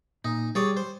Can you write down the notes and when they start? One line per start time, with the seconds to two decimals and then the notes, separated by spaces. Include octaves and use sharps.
0.25 A#2 D#4
0.55 G3 G#4 C#5 D5
0.77 C5